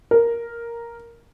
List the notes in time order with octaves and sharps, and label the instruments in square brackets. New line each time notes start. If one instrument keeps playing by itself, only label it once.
[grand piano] A#4